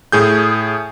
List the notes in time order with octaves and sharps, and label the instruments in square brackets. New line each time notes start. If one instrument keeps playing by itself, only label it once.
[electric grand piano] A2 G#4 G6